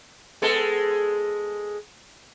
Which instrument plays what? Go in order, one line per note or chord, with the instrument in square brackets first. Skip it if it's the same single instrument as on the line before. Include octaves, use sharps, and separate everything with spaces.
[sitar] G#3 B3 A4